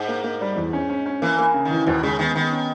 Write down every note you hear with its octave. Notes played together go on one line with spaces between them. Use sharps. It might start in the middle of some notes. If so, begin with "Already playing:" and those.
Already playing: G#2
A#3
A#3
G3
E2
C#4
C#4
C#4
E3 A#3
A#3
C#3
D#3
E3
D#2 B2
C#3 G#3
D#3 B3
D#3 B3
C#4